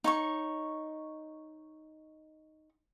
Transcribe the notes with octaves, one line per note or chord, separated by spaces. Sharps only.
D#4 C#5 C#6